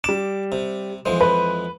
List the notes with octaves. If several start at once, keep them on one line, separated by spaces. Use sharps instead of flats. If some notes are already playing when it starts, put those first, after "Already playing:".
G3 D6 E7
C3
F2 E3 G#3 C5
B4